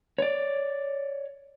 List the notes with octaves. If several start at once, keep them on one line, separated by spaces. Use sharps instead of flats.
C#5 D5